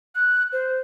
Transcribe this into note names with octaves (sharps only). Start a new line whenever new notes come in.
F#6
C5